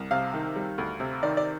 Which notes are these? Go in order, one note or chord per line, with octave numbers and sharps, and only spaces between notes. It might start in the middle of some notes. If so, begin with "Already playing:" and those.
Already playing: C2
C3 F5
D#3
G3
D2
C3
D#3 D5
D5